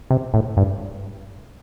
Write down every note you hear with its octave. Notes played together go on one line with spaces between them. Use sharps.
C3
A2
G2